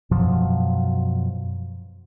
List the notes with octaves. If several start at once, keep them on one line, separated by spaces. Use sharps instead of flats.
F#2 B2 F3 F#3